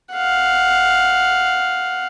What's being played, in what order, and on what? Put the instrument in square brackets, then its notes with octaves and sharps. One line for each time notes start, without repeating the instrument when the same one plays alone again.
[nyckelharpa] F5 F#5